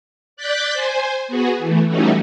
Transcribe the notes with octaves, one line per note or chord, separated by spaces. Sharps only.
D5 F#6 G6 A6 B6
C5 G#5
B3 F#4 G#4
E3 A3
E3 G3 A3 C#4 D#4 F#4